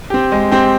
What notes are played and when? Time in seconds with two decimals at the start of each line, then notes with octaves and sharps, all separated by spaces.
0.10 C4 G4
0.32 G#3
0.51 C4 G4